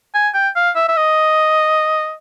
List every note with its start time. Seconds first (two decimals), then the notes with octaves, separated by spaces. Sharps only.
0.14 G#5
0.34 G5
0.56 F5
0.76 E5
0.88 E5
0.97 D#5